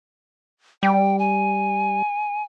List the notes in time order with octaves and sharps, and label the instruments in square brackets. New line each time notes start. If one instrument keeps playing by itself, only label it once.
[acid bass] G3 [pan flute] G5
[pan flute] G#5